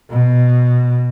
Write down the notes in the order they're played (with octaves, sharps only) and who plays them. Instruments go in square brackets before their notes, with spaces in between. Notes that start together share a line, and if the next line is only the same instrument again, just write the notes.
[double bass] B2